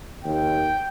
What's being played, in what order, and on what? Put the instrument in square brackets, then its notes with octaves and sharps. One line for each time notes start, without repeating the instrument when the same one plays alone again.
[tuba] D#2 [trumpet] G5